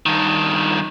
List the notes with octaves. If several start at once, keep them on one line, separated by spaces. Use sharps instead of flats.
G2 D#3